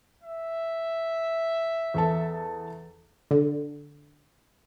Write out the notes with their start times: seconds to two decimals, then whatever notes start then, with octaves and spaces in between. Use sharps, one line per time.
0.23 E5
1.94 E2 A4 A5
3.31 D3